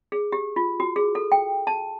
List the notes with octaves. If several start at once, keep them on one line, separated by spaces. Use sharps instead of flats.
G#4
G4
F4
F#4
G#4
A4
G5
A5